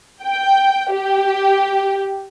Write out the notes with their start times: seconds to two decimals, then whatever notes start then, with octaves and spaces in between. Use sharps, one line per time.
0.24 G5
0.93 G4